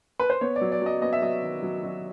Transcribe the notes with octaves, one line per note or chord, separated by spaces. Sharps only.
B4
C5
B3 C#5
D5
F#3
D5
F#3 D#5
B3 D#5
E5
F#3 D#5
D#3
F#3
F#3